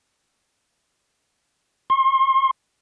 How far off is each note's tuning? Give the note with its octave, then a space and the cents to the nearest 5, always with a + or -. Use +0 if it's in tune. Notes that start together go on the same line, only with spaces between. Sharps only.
C6 +40